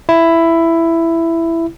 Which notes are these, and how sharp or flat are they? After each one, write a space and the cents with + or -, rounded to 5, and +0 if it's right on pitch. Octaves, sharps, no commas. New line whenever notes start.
E4 +10